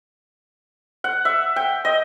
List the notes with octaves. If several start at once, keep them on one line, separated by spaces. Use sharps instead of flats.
F#5
E5
G5
D#5